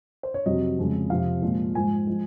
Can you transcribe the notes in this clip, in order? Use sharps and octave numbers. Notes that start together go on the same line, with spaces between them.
C5
C#5
F2 C3 F#3 D#5
F2 C#3 G#3
F2 C3 F3 F5
A#2 F3 G#3
G#2 F3 G#3 G#5
F3 G#3